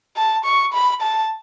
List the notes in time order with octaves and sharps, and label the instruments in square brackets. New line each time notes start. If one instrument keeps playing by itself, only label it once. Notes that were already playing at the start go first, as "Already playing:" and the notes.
[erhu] A5
C#6
B5
A5